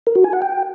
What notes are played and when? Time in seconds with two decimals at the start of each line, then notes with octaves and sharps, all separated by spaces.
0.07 A#4
0.15 F#4
0.24 G#5
0.33 F#5
0.42 G5